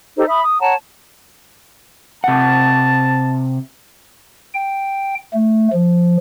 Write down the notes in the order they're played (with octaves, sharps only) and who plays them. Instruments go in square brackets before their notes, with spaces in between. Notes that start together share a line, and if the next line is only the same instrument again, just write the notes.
[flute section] D#4 G4 A4 C5
E5 B5 D#6
D#6
C#5 F#5 A5 A#5
[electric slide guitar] C3 F#5 [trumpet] A5
[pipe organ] G5
A3
F3